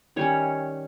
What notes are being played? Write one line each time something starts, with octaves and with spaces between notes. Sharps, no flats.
D#3 G3 C#4 C#5